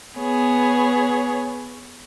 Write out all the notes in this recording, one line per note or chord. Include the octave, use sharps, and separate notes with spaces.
B3 G#4 C#5